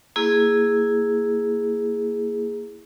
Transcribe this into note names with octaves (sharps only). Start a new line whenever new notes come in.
A#3 E4 G#4